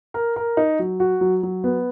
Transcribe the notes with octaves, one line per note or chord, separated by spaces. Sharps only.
A#4
A#4
D#4
F#3
F#4
F#3
F#3
B3